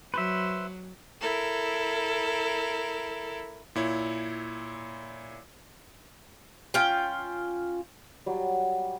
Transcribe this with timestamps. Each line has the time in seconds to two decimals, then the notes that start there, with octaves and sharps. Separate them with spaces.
0.14 F#3 B4 C5 E5
1.20 E4 A4 A#4
3.75 A#2 E4 C#5
6.74 C#4 F4 G5
8.26 F#3 G3